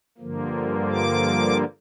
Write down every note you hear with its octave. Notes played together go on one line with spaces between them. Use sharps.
G2 D3 F3 A#3
D6